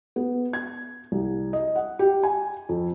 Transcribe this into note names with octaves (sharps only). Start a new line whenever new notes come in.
B3
G#6
C2
D#5
F#5
G4
G#5
F2